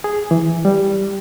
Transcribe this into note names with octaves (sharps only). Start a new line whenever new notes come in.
G#4
E3
G3